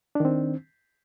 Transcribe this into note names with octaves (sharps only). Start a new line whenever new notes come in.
D#3 C4 D4